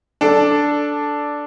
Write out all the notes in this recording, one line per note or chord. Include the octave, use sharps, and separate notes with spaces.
D4 A4